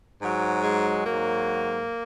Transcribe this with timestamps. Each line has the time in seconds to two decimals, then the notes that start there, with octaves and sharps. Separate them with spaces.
0.19 G#2 F#3
0.62 G#3
1.05 G#2 F#3 A#3